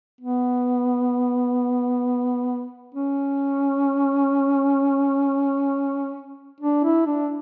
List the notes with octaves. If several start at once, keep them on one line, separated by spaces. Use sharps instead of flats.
B3
C#4
D4
E4
D4